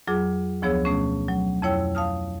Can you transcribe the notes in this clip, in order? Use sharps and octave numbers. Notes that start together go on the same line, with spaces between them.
F2 F#3 F4 G#4 D6
D2 F3 B3 G#4 C#5 E6
B2 A3 C#4
F#3
F2 E4 C#5 G5 E6
F5 A5 D#6 F6